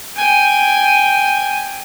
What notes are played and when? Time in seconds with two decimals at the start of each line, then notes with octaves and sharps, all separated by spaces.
0.16 G5 G#5